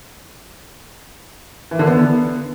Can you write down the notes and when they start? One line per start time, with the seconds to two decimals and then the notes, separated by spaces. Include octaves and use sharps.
1.71 E3
1.79 D3
1.87 B3